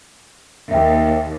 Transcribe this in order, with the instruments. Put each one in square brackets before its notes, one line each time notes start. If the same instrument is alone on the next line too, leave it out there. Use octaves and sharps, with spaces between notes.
[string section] D#2 [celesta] E5 G5